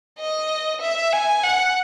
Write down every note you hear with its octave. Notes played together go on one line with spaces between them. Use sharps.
D#5
E5
G#5
F#5